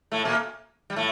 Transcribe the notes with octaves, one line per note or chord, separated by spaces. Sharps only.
A2 A3
A#2 A#3
G3
A2 A3